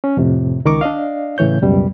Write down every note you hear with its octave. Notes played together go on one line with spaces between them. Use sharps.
C#4
F2 A2 C3
C#2 D#3 A#4 C#6 D6
D4 D5 D#5 F5
A2 C#3 E3 C#5 G6
C#2 F#2 B2 G3